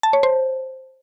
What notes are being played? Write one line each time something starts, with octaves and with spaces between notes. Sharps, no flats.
A5
C#5
C5